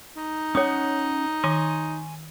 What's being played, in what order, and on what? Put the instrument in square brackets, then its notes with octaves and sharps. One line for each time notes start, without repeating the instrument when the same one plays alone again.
[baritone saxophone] D#4
[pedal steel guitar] C#4 F#5 [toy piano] C#5 D6 D#6
[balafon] D#3 [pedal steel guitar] G#5 C6 C#6